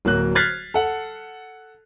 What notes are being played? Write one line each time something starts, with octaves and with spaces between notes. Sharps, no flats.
D1 F#3 A#3 F#6
F6 F#6 G#6 A6 B6 C7
A4 F#5